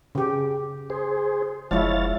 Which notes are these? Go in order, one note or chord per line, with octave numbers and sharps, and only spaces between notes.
C#3 G4
G#4 C5
F1 F3 G#3 E4 C#5 F5 A6